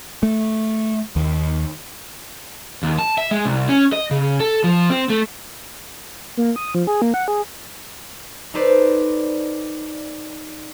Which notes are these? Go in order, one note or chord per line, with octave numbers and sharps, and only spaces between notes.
A3
D#2
D#2
A5
E5
G#3
C2
C#4
D#5
C#3
A4
F3
C4
A3
A#3
D#6
F3
G#4
A#3
F#5
G#4
D#4 A4 B4 C5 D5